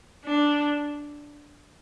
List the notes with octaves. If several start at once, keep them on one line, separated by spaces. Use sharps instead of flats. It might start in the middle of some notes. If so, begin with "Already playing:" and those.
D4